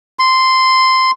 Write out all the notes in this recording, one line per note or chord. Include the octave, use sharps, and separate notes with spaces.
C6